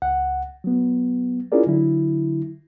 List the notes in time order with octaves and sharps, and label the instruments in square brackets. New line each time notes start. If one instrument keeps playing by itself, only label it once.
[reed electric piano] C#2 F#5
F#3 B3
C#4 E4 F4 G#4 A#4 D5
D3 F#3 E4